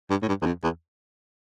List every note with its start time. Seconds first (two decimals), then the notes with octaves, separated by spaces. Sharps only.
0.10 G2
0.22 A2
0.28 G2
0.42 E2
0.46 F2
0.64 E2